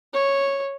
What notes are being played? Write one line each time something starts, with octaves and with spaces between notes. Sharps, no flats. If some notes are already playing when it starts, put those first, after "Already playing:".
C#5